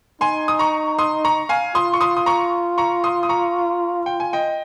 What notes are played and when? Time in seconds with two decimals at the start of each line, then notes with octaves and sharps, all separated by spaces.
0.21 D#4 G#5 C6
0.48 D#6
0.59 A#5 C#6
0.99 C6 D#6
1.25 A#5 C#6
1.49 F5 G#5
1.75 F4 C6 D#6
1.93 C#6
2.01 C6 D#6
2.17 D#6
2.26 A#5 C#6
2.78 A#5 C#6
3.04 C6 D#6
3.23 D#6
3.29 A#5 C#6
4.06 G5
4.20 G#5
4.33 D#5 G5